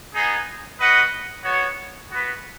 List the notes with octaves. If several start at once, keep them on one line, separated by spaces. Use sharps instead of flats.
B3 D#4 G#4
F#4 B4 D#5 F#5
B3 F#4 C#5
B3 F#4 B4